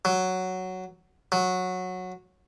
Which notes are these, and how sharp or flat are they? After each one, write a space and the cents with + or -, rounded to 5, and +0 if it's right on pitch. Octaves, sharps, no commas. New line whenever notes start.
F#3 +0
F#3 -15